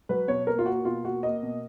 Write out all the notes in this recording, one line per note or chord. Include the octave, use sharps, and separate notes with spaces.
F#3 B4
B2 C#5
A#3 A#4
F4
A#3 F#4
B2 F4
A#3 F#4
A#3 D#5
B2